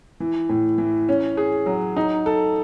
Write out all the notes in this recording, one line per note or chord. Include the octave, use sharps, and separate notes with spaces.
E3
A2
E3
C#4
G#4
F#3
D#4
A4